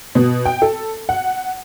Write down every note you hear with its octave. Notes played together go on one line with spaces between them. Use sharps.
B2
G5
A4
F#5